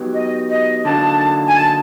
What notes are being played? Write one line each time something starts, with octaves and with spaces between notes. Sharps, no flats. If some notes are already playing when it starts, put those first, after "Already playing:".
Already playing: F#3 B3 D#4 G4
D#5
D#5
D3 F#3 A#3 D#4 A5
G#5
A5